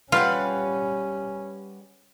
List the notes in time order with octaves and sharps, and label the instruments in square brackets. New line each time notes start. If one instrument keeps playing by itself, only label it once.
[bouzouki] G3 B4 F#5 [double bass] C#4 [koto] F4